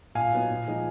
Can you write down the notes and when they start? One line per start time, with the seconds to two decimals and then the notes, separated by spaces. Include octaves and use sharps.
0.15 A#2 F5 G#5
0.33 F#3 B3 D#4
0.50 A#2
0.68 F3 G#3 D#4